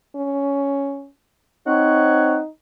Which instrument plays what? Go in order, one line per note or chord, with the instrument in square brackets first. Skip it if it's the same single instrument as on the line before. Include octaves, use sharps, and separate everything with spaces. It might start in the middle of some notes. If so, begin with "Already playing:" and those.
[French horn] C#4
[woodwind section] C4 C#5 F#5 [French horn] D#4